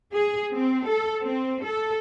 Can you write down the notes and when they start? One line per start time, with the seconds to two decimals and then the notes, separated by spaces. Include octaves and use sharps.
0.14 G#4
0.53 C4
0.88 A4
1.23 C4
1.66 A4